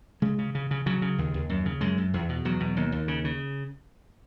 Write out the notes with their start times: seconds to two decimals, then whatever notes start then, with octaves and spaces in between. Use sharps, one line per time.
0.22 C#3 G#3
0.39 C#3
0.55 C#3
0.71 C#3
0.86 C#3 F#3
1.02 C#3
1.18 D#2
1.34 D#2
1.49 F#2
1.66 C#3
1.81 F#2 G#3
1.98 F#2
2.14 E2
2.29 B2
2.45 E2 F#3
2.60 B2
2.77 D#2
2.92 D#2
3.08 C#3
3.24 C#3